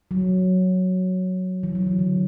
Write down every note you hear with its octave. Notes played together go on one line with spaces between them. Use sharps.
F#3
E3
F#3
E3
D3